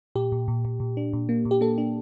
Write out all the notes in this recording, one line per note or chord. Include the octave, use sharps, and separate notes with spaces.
A#2 G4
A#2
A#2
A#2
A#2
D4
A#2
A#3
A#2
G4
A#3 A4
D4